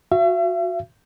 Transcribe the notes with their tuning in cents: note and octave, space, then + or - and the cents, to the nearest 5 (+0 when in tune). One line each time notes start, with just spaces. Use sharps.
F#4 -20 E5 +45